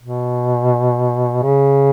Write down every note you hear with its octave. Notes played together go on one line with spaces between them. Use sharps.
B2
C#3